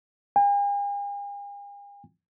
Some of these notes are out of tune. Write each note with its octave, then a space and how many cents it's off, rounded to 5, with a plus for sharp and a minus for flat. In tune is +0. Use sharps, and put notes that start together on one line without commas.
G#5 -45